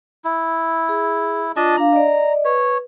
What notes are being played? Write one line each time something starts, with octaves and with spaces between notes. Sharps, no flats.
E4
G#4
D4 F4 D#5 A5
D4 F5 A#5
D5 D#5
B4 C#5